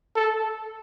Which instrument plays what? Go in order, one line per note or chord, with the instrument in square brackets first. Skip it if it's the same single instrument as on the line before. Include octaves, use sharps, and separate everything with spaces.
[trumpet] A4